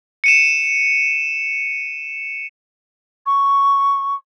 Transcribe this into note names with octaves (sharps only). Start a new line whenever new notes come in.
C#7 D#7 E7
C#6